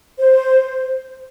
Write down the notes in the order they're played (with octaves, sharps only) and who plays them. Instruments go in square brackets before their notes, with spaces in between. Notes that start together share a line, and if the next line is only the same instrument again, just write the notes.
[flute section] C5